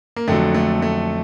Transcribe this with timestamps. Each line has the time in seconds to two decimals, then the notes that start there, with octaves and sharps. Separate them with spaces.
0.16 A#3
0.28 F2 D3 F#3 A3
0.55 A3
0.82 A3